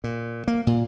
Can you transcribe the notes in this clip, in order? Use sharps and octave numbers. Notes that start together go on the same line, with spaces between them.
A#2
A#3
A#2